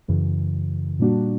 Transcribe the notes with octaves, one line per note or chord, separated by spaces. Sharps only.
F#2 C#3 E3
A#2 G3 A#3 D4 F#4